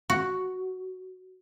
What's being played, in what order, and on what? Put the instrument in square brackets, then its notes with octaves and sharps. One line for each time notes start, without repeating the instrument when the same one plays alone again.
[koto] F#4